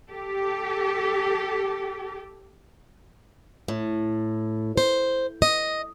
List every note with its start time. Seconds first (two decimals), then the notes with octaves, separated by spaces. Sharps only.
0.10 G4 A4
3.68 A2
4.77 C5
5.42 D#5